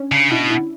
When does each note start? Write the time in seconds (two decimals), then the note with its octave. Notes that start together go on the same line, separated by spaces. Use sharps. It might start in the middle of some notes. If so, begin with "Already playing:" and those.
Already playing: C#4 D4
0.11 C#3 D4
0.31 B2 E4
0.50 E4